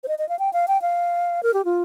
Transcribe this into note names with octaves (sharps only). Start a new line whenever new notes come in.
C5
D#5
D#5
F5
G5
F5
G5
F5
A#4
G4
F4